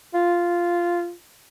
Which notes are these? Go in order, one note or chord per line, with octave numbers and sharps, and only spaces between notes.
F4